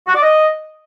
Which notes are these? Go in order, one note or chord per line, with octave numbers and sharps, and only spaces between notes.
F#4
D5
D#5